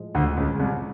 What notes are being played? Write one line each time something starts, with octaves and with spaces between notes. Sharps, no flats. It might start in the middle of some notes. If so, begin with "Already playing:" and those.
Already playing: A2 F3 G#3
D2 D3
C#2 C#3
C2 C3